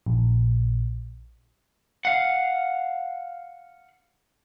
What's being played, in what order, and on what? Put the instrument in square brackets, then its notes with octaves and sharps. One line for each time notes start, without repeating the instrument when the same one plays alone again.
[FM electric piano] A#1
[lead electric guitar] F5 F#5